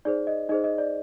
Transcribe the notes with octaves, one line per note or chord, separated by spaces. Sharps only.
D#4 G#4 C5 D5
D#5
D#4 G#4 C5 D#5
D#5
D5